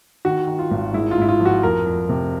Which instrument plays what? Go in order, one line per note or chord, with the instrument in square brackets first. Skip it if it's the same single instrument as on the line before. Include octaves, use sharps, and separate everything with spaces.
[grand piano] D#3 F#4
D#3
F4
G#1
G#3 E4
F4
G#2 E4
F4
F3
F#4
F2 A#4
F2
C3